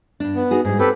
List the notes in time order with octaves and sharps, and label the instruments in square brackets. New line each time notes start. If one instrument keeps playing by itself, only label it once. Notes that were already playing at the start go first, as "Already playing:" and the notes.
[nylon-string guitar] G2 D4
[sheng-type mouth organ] B3
[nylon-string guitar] D#4 F#4 G#4
[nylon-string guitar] G#2 G3 [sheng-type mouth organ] G#4
[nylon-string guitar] C4 [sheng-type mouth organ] G4 A4 B4